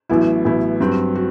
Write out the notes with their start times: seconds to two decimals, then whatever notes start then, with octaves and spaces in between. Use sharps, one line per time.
0.09 A1 A2 F#3 B3 E4
0.45 A1 A2 F#3 B3 E4
0.80 G2 F#3 C4 F#4
1.15 F#4